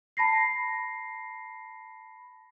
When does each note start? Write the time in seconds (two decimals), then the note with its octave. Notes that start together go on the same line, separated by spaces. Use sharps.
0.17 A5 B5 A#6 C7